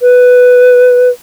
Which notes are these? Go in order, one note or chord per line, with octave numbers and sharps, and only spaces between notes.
B4